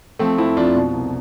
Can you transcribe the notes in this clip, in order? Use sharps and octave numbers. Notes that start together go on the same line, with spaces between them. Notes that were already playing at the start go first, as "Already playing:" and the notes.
F3 A3 C4
F2 C4 E4
F2 D4 F4
B2
C2